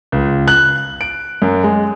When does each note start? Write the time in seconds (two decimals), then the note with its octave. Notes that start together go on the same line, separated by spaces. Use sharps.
0.12 C#2
0.48 F#6
1.01 D7
1.42 F#2
1.64 G#3